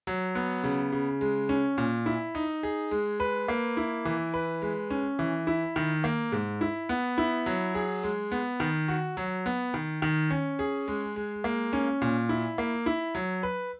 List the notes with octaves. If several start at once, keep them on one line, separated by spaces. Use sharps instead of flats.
F#3
B3
C#3
C#3
G#3
C#4
A#2
E4
D#4
G#4
G#3
B4
A#3
E4
E3
B4
G#3
C#4
E3
E4
D#3
A#3
G#2
E4
B3
E4
F#3
G#4
G#3
B3
D#3
F#4
F#3
B3
D#3
D#3
C#4
G#4
G#3
G#3
A#3
C#4
A#2
E4
A#3
E4
F#3
B4